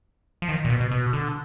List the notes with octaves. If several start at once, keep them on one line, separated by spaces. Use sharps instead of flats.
F3
D#3
A#2
B2
B2
B2
D3